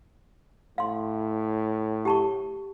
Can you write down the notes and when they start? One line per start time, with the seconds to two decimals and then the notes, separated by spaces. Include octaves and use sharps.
0.78 A2 F5 C6
2.05 G4 A5 C#6